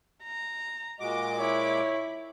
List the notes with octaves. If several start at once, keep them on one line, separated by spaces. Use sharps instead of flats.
A#5
A#2 G#3 F#4 D#5 D6
E4 C#5